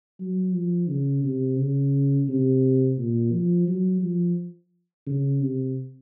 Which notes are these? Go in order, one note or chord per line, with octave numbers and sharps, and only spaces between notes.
F#3
F3
C#3
C3
C#3
C3
A#2
F3
F#3
F3
C#3
C3